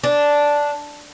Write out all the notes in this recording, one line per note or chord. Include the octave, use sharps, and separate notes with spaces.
D4